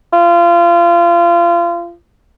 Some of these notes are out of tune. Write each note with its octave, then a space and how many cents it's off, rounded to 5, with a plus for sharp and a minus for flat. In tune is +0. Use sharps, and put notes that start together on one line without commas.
F4 -30